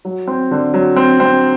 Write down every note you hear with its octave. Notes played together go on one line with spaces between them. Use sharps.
F#3
C4
D3
F#3
C4
C4